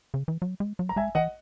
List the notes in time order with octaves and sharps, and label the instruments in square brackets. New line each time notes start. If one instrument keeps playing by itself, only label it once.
[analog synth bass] C#3
E3
F#3
G#3
F#3
[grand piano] A#5
[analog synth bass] G#3 [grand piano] E5 G#5
[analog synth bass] E3 [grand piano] D#5 F#5